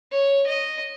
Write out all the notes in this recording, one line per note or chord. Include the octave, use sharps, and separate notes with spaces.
C#5
D#5